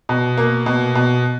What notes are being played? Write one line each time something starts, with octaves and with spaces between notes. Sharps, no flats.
B2
A#3
B2
B2